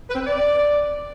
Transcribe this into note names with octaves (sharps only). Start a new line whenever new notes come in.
B4
C4
B4
D5